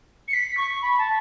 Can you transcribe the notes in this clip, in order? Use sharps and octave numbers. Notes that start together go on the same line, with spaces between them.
C#7
B6
C#6
B5
A5